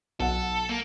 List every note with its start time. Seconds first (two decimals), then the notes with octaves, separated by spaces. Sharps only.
0.20 B1 A4 F#5
0.69 A#3